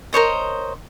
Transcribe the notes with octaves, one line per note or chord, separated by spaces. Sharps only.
A#4 C5 C#5 D#5